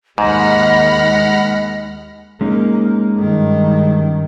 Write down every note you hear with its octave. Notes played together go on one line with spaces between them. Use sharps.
D#2 G#2 D#3 G#3 D#5 F#5 B5 F6
G#3 A#3 C#4 D#4
G2 D#3